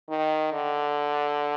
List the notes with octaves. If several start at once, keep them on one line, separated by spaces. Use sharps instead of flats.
D#3
D3